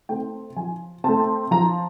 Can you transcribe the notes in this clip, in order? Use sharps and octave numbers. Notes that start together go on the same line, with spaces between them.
A3 C4 G5
F3 G#5
A3 C4 A5
F3 A#5